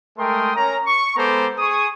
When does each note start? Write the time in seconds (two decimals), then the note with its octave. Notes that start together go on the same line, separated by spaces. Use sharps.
0.18 G#3 A3 A#4 G5 C6 D#6
0.56 C#4 A#4 C#5 A#5
0.86 C#6
1.16 G#3 B3 A4 C5 A#5 D6
1.58 G#4 C#6 D#6